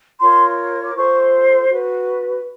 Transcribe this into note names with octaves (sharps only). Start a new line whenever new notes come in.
F4 A#4 C#5 C6
D6
F4 A4 C5 C#6
F#4 B4